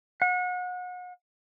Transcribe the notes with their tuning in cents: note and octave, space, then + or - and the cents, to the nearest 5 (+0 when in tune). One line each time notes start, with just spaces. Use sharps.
F#5 -35